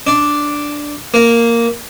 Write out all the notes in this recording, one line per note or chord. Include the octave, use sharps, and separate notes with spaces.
D4
A#3